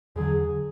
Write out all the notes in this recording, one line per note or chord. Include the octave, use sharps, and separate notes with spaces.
E2 D3 F#3 G#4